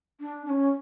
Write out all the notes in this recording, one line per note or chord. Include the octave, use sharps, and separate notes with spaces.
D4
D4
C#4